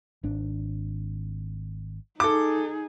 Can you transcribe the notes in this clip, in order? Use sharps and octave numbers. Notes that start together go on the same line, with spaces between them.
G#1 D4
D#4 G#4 A4 D6